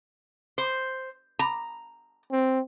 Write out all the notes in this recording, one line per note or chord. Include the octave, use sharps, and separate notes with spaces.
C5
A#5
C4